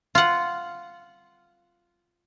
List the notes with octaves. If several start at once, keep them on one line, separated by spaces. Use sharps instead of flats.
F4 F#5